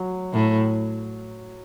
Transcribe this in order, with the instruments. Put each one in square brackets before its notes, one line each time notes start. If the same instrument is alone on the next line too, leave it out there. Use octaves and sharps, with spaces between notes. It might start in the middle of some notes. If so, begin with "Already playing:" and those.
Already playing: [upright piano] F#3
[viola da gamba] A2